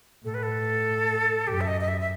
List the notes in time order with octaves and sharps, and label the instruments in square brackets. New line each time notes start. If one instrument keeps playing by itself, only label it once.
[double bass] A2 [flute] A4
[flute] B4
A4
[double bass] F#2 [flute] G4
[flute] E5
D#5
D#5
E5
E5